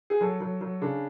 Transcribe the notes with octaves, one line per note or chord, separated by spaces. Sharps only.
G#4
F#3 A4
F#3
F#3
C#3 D4